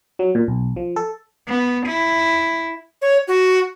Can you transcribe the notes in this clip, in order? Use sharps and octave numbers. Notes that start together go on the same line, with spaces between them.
F#3
A#2
B1
F3
A4
B3
E4
C#5
F#4